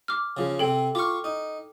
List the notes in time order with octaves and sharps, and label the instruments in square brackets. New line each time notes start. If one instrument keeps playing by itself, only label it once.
[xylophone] D6 F6
[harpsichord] C#3 F3
[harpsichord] C3 C4 [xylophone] A4 G5
[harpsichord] F4 C#6 [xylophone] D6 F6
[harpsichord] D#4